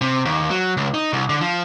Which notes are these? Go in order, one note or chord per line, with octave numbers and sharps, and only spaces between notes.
C3
D#2
F#3
C#2
D#4
C2
D3
F3